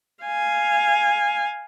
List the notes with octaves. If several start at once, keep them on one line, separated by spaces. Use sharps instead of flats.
F5 G#5